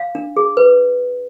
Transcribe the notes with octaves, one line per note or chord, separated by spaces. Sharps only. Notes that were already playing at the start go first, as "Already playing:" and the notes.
Already playing: F5
D4
G#4
B4